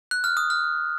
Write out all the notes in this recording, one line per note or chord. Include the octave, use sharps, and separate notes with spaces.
F#6
F6
D#6
F6